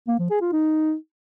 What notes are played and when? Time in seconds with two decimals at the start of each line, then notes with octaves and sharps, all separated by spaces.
0.08 A#3
0.19 F3
0.30 G#4
0.41 F4
0.52 D#4